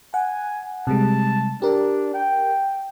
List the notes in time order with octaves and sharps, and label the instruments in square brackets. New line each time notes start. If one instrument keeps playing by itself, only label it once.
[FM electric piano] F#5 [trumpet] G#5
[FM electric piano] C3 G3 G#3 [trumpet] A5
[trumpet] D4 [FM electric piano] G4 A#4
[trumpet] G5